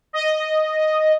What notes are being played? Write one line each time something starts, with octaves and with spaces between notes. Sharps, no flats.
D#5